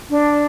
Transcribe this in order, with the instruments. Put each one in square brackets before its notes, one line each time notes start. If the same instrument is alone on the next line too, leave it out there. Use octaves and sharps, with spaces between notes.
[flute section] D4